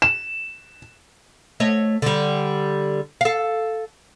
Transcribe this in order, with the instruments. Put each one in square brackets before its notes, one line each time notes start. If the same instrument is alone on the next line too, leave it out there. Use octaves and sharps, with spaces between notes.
[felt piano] E7
[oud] A3 C#5 D#5
D3 G3
A4 F5